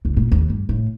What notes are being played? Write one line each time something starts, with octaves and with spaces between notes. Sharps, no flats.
C#2
A#2
D#2
G2
A2